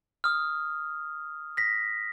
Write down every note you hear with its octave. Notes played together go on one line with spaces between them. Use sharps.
D#6 F6
A#6 B6